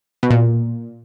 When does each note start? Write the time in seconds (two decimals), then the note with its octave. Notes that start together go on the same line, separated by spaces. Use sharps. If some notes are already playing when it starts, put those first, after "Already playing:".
0.23 B2
0.30 A#2